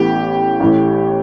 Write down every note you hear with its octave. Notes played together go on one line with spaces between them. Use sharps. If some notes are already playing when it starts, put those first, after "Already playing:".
Already playing: A1 A2 E3 B3 G4
A1 A2 E3